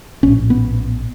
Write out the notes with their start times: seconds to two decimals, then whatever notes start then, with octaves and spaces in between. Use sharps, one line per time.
0.23 A#1 A2 C#4
0.50 B3